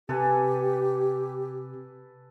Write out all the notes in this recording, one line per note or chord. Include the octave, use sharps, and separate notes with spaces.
C3 G4 A4 B4 G#5